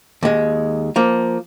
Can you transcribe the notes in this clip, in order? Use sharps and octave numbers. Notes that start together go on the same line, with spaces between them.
D#2 G#3
F3 A#3